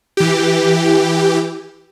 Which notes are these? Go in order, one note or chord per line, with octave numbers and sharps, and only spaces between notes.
E3 G4